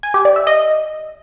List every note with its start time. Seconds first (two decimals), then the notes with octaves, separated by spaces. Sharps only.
0.03 G#5
0.14 G4
0.25 D5
0.36 E5
0.47 D#5